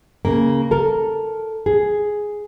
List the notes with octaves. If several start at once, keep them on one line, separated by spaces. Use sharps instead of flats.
C#3 A#3
A4 A#4
G#4